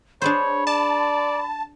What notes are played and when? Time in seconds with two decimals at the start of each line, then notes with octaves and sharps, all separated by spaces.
0.22 D4 G#4 C5 C#5 B5
0.67 D5 A5